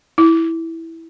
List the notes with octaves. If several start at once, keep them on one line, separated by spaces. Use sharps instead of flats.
E4